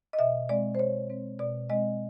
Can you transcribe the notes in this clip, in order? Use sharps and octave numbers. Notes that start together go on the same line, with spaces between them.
D#5
B2 E5
G#3 C4 D5
C5
B2 C#5
G#3 C4
B2 D5
G#3 C4 D#5